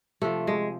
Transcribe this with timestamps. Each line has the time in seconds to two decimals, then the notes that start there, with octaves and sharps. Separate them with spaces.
0.22 C3 F3 A3
0.47 G#3